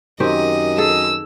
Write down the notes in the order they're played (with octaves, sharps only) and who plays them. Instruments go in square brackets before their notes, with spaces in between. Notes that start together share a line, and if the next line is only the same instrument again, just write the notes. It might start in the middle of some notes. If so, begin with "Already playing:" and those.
[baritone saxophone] F#2 [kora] D#3 C4 G4 [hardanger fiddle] D#5
[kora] G#4 A4 [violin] E6